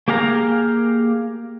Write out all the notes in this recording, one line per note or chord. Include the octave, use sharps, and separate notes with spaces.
A#3 G4 G#4 F5 A#5